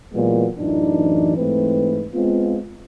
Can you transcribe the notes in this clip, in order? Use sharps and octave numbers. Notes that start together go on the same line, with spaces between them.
A#2 E3 F#3 G#3 A#3 B3
A1 F#2 E3 D4 D#4
G#2 E3 A3 C4 B4
G#3 B3 C4 F4